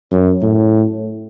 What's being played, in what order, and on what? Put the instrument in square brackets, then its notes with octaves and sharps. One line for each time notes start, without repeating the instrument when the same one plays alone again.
[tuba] F#2
A2